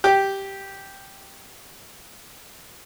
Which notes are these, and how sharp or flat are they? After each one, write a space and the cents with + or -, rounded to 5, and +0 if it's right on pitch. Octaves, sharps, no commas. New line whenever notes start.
G4 -5